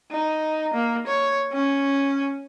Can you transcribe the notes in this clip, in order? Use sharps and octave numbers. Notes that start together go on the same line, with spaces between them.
D#4
A#3
C#5
C#4